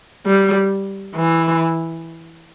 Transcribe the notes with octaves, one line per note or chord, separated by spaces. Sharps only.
G3
E3